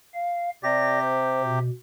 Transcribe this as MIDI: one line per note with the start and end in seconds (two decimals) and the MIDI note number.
0.14 0.50 77
0.63 1.59 48
0.63 1.59 67
0.63 0.99 74
0.63 0.99 94
1.00 1.42 72
1.43 1.70 47